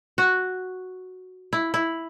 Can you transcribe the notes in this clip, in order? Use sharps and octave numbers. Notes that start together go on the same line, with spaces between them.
F#4
E4
E4